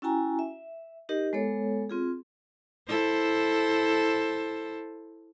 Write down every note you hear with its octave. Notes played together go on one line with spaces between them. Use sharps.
C#4 E4 F#4 G5 G#5 A#5
E5
D#4 G4 A#4 D#5
G#3 B3 A4 C#5
C4 F4 G#4
E4 A4 C5